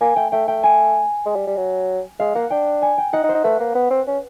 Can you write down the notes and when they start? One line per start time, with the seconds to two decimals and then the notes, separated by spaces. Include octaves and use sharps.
0.01 A#3 G#5
0.16 A3 G5
0.32 A3 G5
0.48 A3 G5
0.63 G#5
1.26 G#3
1.36 G3
1.47 G3
1.57 F#3
2.20 G#3 F5
2.35 A#3 F#5
2.50 D4 G5
2.82 G#5
2.98 G5
3.13 D#4 F#5
3.24 D#4
3.29 C5
3.35 D#4
3.44 A3 B4
3.60 A#3
3.75 B3
3.91 C4
4.07 C#4